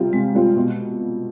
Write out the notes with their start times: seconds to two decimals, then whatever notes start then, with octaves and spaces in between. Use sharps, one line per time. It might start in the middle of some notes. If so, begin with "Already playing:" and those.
Already playing: C3 G3 C4 F4
0.13 C3 G#3
0.35 G3 C4 F4
0.56 B2